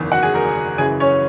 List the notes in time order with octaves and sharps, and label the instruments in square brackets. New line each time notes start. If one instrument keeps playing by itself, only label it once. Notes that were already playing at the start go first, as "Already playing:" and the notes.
Already playing: [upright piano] F#1 E2 D#3
F#4 F#5
G#4 G#5
A#4
F#1 F#2 C#3 E3 G#4 G#5
C#4 C#5